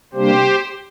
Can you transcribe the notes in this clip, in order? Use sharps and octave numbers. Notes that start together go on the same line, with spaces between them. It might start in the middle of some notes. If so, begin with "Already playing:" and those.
C3 G3 A#3 D4 G4 C5